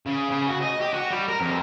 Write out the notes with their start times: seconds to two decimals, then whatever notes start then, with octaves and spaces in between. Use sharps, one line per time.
0.06 C#3
0.30 C#3
0.47 F#4
0.61 D#5
0.81 G4
0.93 F#4
1.10 G3
1.28 A#4
1.41 F2